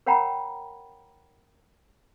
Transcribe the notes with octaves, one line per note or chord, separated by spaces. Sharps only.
A#4 C#5 F#5 G5 A#5 B5